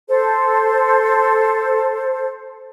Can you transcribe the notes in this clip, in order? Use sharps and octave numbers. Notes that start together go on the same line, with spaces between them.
A4 C5